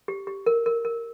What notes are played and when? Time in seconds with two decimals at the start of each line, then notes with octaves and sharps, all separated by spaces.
0.08 G4
0.27 G4
0.46 A#4
0.66 A#4
0.85 A#4